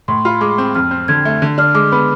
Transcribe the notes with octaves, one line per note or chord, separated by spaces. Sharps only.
A2 C6
F4 B5
G#3 D6
C4
F2 F6
C4
D3 G#6
A3
D3
D4 F6
G#3 D6
B3 B5